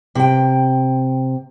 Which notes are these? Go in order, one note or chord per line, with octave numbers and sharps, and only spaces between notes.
C3 G5